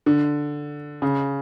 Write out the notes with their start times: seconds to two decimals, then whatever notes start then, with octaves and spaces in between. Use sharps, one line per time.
0.06 D3
1.02 C#3